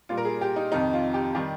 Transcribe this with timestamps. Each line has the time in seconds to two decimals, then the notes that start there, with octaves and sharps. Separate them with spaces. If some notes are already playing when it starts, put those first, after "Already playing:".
0.09 A#2 G3 F4
0.17 A#4
0.25 G#4
0.41 G4
0.56 D#4
0.72 F2 C3 D#3 D#4
0.93 F4
1.14 G4
1.35 D#3 G3 G4